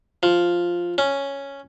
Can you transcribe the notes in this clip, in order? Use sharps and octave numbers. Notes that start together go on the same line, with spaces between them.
F3
C#4